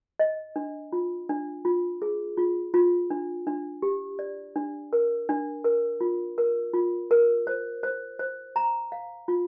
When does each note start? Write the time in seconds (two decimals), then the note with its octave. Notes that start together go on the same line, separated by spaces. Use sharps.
0.19 D#5
0.56 D4
0.93 F4
1.29 D4
1.65 F4
2.02 G#4
2.37 F4
2.74 F4
3.11 D4
3.47 D4
3.82 G4
4.19 D5
4.56 D4
4.93 A#4
5.29 D4
5.64 A#4
6.01 F4
6.38 A#4
6.74 F4
7.11 A#4
7.47 C5
7.83 C5
8.19 C5
8.56 A#5
8.92 F5
9.28 F4